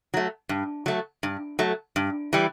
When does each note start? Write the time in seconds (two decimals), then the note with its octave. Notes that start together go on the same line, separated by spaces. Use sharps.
0.14 F#3 A3
0.49 G2
0.86 F#3 A3
1.23 G2
1.59 F#3 A3
1.96 G2
2.33 E3 G3